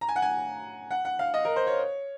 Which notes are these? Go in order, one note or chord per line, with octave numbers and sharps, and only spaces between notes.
A#5
G#5
F#5
G#5
F#5
F#5
F5
D#5
A#4
C5
C#5